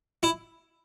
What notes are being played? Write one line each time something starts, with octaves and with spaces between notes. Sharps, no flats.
E4